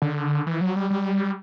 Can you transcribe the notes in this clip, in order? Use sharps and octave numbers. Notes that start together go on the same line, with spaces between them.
D3
E3
F#3
G3
G3